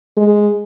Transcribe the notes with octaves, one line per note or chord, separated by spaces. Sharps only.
G#3